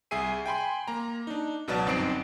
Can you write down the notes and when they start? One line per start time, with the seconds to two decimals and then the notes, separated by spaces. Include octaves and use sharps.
0.11 C2 G#4 E5 G#5 C7 D#7
0.46 G5 G#5 B5 C6
0.88 A#3 A#5
1.27 D4 D#4
1.68 C#2 B2 F#3 B4 D5 A5
1.86 G1 F#2 C4 D#4 C7 D7